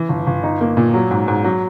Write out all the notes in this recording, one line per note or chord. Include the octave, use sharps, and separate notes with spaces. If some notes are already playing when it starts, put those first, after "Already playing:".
Already playing: E3
G1
G1
D#4
A#3
A#2
F#3
G#2
G#2
F#3